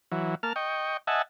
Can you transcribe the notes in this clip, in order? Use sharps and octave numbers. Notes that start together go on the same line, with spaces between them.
E3 F#3
A#3 A5 F6
D#5 G5 C#6
D#5 E5 F#5 G#5 A5